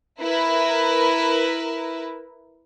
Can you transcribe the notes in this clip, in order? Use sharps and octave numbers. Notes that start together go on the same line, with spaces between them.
E4 A#4 B4